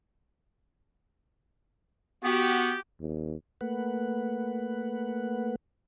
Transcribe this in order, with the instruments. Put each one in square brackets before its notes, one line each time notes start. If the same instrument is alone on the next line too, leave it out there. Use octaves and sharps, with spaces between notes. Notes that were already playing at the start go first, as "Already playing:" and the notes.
[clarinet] B3 [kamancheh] F#4 [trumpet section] G4
[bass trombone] D#2
[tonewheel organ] A3 A#3 B4 F#5